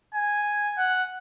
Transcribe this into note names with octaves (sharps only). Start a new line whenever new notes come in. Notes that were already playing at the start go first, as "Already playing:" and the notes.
G#5
F#5